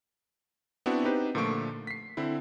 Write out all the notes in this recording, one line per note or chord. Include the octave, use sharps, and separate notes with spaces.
B3 C4 D4 E4 F#4
C4 D#4 G4 B4 C5
A#2 D3 F3 A3 C#6 D7
B6 C7
D3 C4 E4